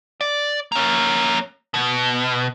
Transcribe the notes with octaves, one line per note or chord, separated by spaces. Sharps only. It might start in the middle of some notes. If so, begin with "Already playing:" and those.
D5
A#3 C#4
B2